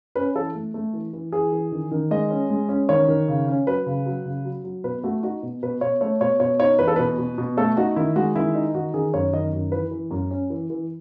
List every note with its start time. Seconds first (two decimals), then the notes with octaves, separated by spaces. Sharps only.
0.15 C#4 B4
0.35 E3 A4
0.55 A3
0.74 A3
0.93 E3
1.13 E3
1.32 E3 G#4
1.52 E3
1.72 D#3
1.91 D#3
2.11 G#3 D#5
2.31 C#4
2.50 G#3
2.69 C#4
2.89 D#3 C#5
3.08 D#3
3.28 C#3
3.48 C#4
3.67 F#3 B4
3.86 C#3
4.06 F#3
4.25 C#3
4.45 F#3
4.64 F#3
4.84 B2 B4
5.04 A3 F#4
5.23 D#4 F#4
5.43 B2
5.63 B2 B4
5.81 B2 C#5
6.01 A3 C#5
6.21 B2 C#5
6.40 B2 C#5
6.60 D#4 C#5
6.79 E2 B4
6.88 A4
6.96 B2 B4
7.18 B2
7.38 B2
7.57 A3 A4
7.77 D#4 F#4
7.96 D#3 E4
8.16 G#3 F#4
8.35 D#3 E4
8.55 D#4
8.74 D#3 F#4
8.94 D#3 G#4
9.14 F#2 C#5
9.33 D#3 D#5
9.53 F#2
9.72 E3 B4
9.91 E3
10.11 F#2
10.31 C#4
10.50 E3
10.70 E3